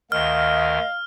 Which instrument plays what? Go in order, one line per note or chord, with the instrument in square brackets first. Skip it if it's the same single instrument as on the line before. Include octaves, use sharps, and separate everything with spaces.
[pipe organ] D2 D#3 [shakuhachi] D#5 [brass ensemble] F5 [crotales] F6